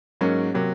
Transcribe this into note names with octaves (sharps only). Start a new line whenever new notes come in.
G#2 F#3 A#3 C#4
C3 F#3 A#3